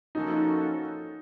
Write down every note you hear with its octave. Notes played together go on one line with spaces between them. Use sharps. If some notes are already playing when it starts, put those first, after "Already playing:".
F3 A#3 C#4 D#4 F#4 A4